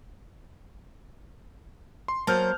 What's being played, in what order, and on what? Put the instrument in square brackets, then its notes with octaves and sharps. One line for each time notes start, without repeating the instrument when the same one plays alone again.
[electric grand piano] C6
[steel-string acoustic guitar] F#3 A#3 C5 [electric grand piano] A5 F6 G6